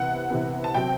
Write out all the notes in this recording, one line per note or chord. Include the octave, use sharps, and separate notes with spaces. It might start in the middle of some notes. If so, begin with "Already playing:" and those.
Already playing: C3 E3 B3 F#5
C3 E3 B3
A5
C3 F#3 C4 G5